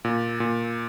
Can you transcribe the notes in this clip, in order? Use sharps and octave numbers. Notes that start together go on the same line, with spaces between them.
A#2
A#2